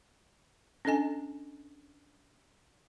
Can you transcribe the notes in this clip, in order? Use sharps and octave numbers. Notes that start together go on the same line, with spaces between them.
C#4 D4 A4 D#5 G#5